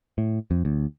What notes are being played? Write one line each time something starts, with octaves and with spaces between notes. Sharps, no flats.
A2
F2
D2